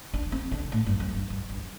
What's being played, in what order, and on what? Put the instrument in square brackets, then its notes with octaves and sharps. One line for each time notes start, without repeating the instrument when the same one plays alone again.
[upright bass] D4
C4
D3
A2
G2
F2
G2
G2
G2